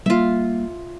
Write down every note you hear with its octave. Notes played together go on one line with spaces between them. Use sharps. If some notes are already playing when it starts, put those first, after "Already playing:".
G3 A3 A#3 F4 E5